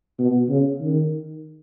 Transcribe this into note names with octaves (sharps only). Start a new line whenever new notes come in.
B2
C#3
D#3